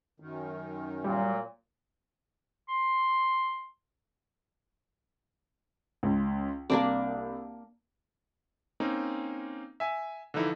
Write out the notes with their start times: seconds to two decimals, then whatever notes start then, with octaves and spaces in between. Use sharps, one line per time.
0.20 F#2 D#3
1.04 A#2 F#3 G3
2.69 C6
6.03 C#2
6.70 C2 A#3 D4 D5
8.80 A#3 C4 C#4 D#4
9.80 E5 G#5
10.34 D3 E3 F3 D#4 E4